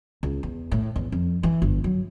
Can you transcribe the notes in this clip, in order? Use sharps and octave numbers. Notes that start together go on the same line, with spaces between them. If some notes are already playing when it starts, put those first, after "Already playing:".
C#2
E2
A2
E2
F2
E3
G1
F#3